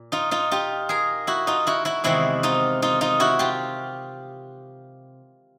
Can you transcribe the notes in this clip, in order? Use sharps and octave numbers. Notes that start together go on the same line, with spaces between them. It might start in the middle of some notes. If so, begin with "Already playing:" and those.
Already playing: A#2
D#4 F4
D#4 F4
F4 G4
G#4 A#4
E4 F#4
D#4 F4
E4 F#4
E4 F#4
E2 C3 D#3 G#3 C4 E4 F#4
D#4 F4
D#4 F4
D#4 F4
E4 F#4
F4 G4